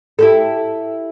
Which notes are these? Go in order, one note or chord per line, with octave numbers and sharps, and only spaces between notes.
E4 G4 A4